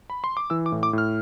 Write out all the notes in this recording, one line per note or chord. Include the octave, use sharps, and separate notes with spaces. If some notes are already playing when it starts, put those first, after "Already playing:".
B5
C6
D6
E3 E6
D6
A2
D6
A2 F6